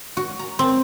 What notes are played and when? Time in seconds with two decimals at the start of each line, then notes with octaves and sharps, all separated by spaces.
0.17 F#4
0.39 A#5
0.59 C4